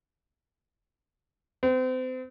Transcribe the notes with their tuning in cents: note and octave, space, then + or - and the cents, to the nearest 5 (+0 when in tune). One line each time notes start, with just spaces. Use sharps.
C4 -35